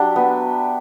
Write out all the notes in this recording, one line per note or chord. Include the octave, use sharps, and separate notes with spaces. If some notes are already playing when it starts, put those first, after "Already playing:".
Already playing: F#3 D4 G4 E5
B3